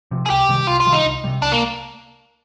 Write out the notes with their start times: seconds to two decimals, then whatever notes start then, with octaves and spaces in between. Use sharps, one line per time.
0.11 C3 F3
0.26 G#4
0.30 C2 G4
0.49 C3 D#3 G3
0.68 C2 F4
0.80 F4
0.86 C3 D#3 G3
0.92 D#4
1.05 C2
1.24 C3 D#3 G3
1.42 C2 D4
1.52 A#3